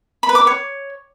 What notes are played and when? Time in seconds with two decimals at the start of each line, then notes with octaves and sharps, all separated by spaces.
0.23 B5
0.29 B4
0.35 D6
0.41 B4
0.47 C#5